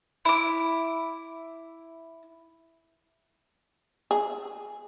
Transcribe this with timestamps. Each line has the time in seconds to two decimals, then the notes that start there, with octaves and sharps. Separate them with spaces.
0.25 E4 D6
4.11 G#4